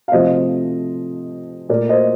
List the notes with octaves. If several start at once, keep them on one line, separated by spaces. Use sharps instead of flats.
F5
C3 F3 A3 C5 D#5
A#2 A3 A#4 D5
C5 D#5